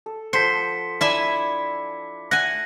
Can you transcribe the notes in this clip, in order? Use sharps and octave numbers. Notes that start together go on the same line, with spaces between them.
A4
F3 A4 C5 F#5 B6 C#7
D4 E4 D5 E5 G#5
E5 F#5 G#5 A#6